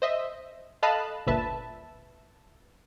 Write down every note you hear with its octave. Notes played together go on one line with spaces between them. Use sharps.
C5 D#5 E5
A4 D#5 F5 A5 B5 F#6
G1 D2 A#2 B4 E5 A5